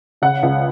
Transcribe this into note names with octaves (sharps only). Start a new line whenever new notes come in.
C#3 F#5
C#2